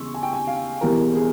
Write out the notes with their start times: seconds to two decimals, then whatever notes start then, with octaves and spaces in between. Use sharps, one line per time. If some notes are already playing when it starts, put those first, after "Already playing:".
Already playing: E2 C#3 E3 G#3 C6 C#6 E6
0.14 G#5
0.23 G5
0.33 G#5
0.47 F5
0.81 E1 E2 E3 G3 A#4
1.15 G#4